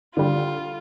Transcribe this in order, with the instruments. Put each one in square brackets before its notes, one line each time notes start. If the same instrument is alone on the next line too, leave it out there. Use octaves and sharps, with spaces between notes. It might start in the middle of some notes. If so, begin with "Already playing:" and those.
[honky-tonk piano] D3 G3 [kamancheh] F4